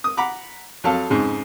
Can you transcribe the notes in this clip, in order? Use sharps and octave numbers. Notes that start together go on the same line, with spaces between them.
D#6
F#5 A#5 B5 D6
F2 F#3 A4 F5 A5
F2 G#2 C#3